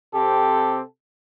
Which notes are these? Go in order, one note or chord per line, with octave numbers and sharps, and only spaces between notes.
C3 C4 G4 A4